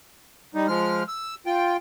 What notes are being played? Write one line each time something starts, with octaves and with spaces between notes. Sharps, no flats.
G3 D#4
F3 G#3 F6
E6
F4 G5